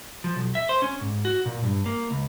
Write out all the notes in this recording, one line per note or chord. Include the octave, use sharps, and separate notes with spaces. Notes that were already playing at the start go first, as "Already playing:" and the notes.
F3
B1
E5
C5
C#4
G#2
F#4
A#2
G2
A#3
C#2